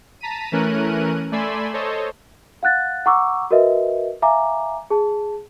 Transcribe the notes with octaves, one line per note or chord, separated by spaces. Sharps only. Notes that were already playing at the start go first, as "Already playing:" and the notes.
A5 A#5 B6 D#7
E3 A3 C#4 A#4 F#6 D#7
A3 D5 G#5 B5 C6 E6
A4 C5 C#5 D#5
F5 F#5 F#6 A6
F#5 A#5 C#6 D6 E6
F#4 A#4 B4 D#5 E5
E5 F5 G#5 A#5 D6
G#4 A5